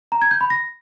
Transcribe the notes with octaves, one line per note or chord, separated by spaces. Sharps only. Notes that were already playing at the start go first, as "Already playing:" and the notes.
A#5
G#6
G6
B5
A#6